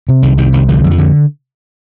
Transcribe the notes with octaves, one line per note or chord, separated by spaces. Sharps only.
C3
C2 D#3
C3 D#3
C2 D#3
D3 F3
F2 G3
F3
D3